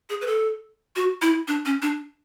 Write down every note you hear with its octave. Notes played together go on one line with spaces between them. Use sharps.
G#4
B4
A4
F#4
E4
D4
C#4
D4